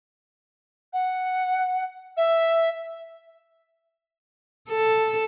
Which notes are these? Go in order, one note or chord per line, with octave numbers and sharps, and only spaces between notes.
F#5
E5
A4